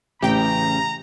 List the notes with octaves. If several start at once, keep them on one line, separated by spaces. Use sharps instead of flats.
A1 C#3 G4 G5 A#5